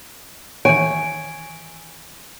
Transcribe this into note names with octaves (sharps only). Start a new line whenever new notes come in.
D#3 E3 C#5 G#5 D7